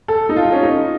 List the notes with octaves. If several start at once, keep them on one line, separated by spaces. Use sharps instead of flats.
A4
D#4
F4
C#4
D#4